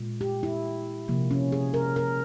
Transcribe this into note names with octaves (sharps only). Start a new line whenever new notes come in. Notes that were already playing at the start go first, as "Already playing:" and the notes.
Already playing: A#2 G#3
G4
E4
C3 F3 A#3
C#4
G#4
A#4
A#4